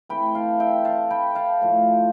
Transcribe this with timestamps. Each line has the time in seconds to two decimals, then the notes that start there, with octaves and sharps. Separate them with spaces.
0.09 E3 A3 C4 G5 B5
0.35 F5 A5
0.60 E5 G5
0.85 F5 A5
1.10 G5 B5
1.35 F5 A5
1.61 A2 F3 A3